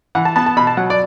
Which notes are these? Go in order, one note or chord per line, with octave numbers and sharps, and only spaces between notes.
E3 F#5
A5
B3 A5
A5
B2 B5
A5
F#3 F#5
D5